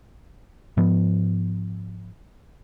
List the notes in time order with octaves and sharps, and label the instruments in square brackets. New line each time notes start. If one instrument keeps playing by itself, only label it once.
[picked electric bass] G#2 F3 B3